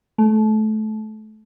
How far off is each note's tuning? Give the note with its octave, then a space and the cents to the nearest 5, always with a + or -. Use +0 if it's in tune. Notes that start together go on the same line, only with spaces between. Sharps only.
A3 -25